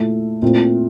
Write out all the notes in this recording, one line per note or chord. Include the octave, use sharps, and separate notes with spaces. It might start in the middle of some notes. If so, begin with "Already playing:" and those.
Already playing: A#2 A3 E4
A#2 A3 C4 E4